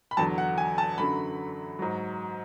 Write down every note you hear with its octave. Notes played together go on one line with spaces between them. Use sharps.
B5
E2 D3 F#3 A5
F#5
G#5
A5
F#2 D3 F#3 B5
G#2 F#3